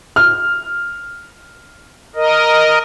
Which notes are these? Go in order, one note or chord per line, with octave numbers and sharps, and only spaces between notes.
F6
A#4 D#5